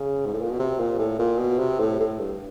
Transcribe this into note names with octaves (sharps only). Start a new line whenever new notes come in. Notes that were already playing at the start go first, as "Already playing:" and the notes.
Already playing: C#3
G#2
A2
A#2
B2
C3
A#2
A2
A#2
B2
C3
A2
A2
G2